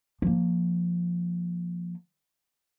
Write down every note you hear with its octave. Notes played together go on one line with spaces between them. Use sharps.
F3 A#3